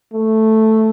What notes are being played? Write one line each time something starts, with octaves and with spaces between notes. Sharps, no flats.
A3